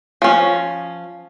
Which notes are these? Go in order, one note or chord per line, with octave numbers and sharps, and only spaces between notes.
F3 C#4